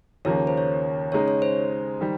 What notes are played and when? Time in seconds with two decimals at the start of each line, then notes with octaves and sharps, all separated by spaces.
0.25 D#2 C#3 F3 A#3 C#5
0.47 C5
0.57 C#5
1.12 C#3 G#3 D#4 C#5
1.28 C#5
1.42 C5
2.01 D#3 G3